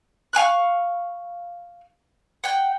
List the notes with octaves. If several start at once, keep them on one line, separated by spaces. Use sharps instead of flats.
F5 G#5 C#6 F#6
F#5 G5